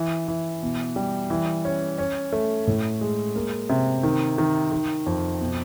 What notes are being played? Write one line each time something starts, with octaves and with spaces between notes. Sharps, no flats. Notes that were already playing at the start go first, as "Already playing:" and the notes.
Already playing: E3
E3
B2
G3
E3
C#4
C#4
A3
A2
G#3
A#3
C3
D#3
D#3
D#3
F2
B2